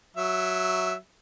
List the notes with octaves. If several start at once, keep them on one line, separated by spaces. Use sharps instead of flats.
F#3 E5